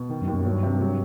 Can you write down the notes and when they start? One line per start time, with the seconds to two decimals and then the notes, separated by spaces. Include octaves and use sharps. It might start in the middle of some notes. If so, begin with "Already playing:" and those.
Already playing: B2
0.09 D#3
0.21 F#2
0.27 D#2
0.34 F#2
0.45 G2 F#3
0.63 C3
0.81 F#3